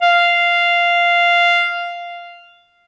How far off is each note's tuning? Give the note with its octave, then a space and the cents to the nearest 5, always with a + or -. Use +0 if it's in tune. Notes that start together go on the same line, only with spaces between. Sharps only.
F5 -5